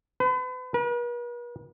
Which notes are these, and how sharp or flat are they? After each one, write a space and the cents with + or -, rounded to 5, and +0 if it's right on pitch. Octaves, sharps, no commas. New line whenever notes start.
B4 +40
B4 -45